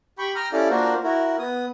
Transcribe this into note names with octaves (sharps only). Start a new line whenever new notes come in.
G4 G5 B5 C#6
G5 A#5 D#6 F6
C#4 E4 G4 A4 D5 F5
A#3 D4 F4 F#4 A#4 C5
E4 F#4 A#4
B3 D#6